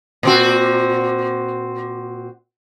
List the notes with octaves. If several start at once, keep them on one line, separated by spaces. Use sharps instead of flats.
A#2 C4 F#4